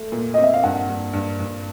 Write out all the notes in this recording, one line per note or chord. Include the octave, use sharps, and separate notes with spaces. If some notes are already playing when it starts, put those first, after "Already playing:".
Already playing: A3
A#2
C4 D#5
E5
F5
G2 F#5
G2
G2
G2